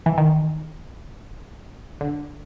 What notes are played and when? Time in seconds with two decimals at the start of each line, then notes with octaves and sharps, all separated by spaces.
0.06 E3
0.18 D#3
2.01 D3